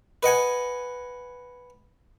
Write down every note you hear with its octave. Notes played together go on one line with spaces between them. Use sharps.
B4 D#5 F#5 G#5